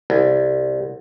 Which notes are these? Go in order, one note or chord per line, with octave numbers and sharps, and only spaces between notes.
C2